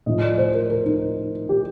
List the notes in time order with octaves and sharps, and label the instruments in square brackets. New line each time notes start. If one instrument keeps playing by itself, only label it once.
[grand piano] A2 F3 D#5
D5
C5
A#4
A#4
D#4
G4